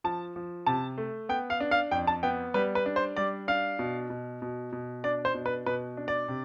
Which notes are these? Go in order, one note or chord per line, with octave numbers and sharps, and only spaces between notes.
F3 A5
F3
C3 A5
A3
B3 G5
F5
D4
F5
F2 G5
A5
B3 G5
G3 B4
B4
D4
C5
G3 D5
D4 F5
B2
B2
B2
B2
D4 D5
C5
B2
B4
B2 B4
D4
D5
C3